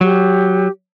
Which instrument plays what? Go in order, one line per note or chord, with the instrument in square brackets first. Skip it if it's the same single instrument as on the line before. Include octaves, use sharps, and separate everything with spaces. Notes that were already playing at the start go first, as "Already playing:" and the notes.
[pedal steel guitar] F#3 [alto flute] G4